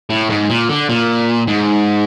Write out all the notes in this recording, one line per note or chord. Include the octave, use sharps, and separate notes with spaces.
A2
G#2
A#2
D3
A#2
G#2